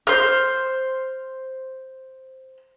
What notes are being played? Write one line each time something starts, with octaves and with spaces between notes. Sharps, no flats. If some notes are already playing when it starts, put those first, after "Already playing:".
C5 F6